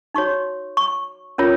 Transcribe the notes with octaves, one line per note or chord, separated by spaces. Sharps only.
D#4 F#4 C#5 C#6
C#6
C#4 F4 A#4 C#5